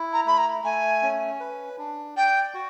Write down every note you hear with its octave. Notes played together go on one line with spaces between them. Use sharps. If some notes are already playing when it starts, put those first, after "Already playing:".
Already playing: E4
A#5
A3 B5
A#5
A3 G#5
C#4
B4
D4
D5 G5
F#4